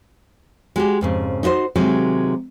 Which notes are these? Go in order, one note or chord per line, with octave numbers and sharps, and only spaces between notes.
G#3 F#4 G4
F2 G#2 C#3
D#4 E4 F#4 C5
C3 D#3 F#3 G#3